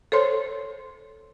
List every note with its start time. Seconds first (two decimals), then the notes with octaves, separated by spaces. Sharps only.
0.12 A4 C5 C#5 C6